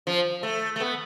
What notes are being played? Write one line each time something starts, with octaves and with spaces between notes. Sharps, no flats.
F3
A3
A3
B3